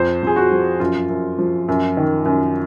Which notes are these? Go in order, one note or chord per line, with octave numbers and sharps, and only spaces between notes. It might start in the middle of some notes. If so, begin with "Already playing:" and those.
Already playing: F2 C5
F2 G#4
F#4
F3
F#2 F4
F#2
F3
F#2
D#3
F#2